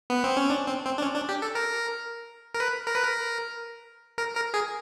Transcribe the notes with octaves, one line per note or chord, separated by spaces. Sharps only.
B3
C4
C#4
D4
C4
C4
D4
C#4
D4
G4
A4
A#4
A#4
B4
A#4
B4
A#4
A#4
A#4
G#4